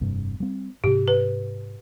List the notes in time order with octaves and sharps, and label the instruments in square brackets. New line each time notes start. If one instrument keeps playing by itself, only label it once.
[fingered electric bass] F1 G2 C3
G3 C4
[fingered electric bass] G#2 C3 [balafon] G4
[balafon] B4